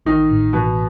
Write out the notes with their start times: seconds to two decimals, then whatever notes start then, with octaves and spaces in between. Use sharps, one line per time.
0.06 A1 D#3 D#4
0.30 A2
0.53 B2 E3 B3